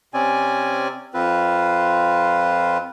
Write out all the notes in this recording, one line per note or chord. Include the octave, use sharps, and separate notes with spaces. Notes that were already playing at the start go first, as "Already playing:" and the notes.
C3 C4 C#4 D5 G#5
F2 C4 F4 B4